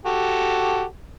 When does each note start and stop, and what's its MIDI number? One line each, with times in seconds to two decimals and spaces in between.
0.06 0.83 66
0.06 0.83 67
0.06 0.83 69